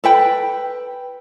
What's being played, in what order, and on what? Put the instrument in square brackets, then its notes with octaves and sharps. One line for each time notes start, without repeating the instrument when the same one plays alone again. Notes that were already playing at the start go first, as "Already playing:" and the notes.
[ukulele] A4 B4 G5 B5